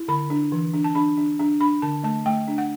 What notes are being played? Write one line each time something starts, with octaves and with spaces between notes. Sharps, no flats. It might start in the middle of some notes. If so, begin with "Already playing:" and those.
Already playing: E4
D3 B5
D4
E3
D4
A5
D4 B5
D4
D4
D4 B5
D3 A5
A3 A5
A3 G5
D4
F#5